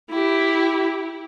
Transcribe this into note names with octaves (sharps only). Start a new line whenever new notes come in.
E4 G4